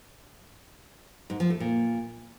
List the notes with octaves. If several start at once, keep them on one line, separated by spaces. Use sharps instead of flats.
G#2
F3
A3
A#2